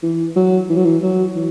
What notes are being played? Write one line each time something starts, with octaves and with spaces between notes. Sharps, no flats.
E3
F#3
E3
F#3
E3
F#3
E3